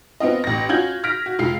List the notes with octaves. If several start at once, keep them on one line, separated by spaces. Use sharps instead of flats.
B3 C4 F4 D#5
A1 A#6
C#4 F4 F#4 G6 G#6 F#7
F6 A#6 B6 D7
F#4
F1 G#3 F4 F5 C7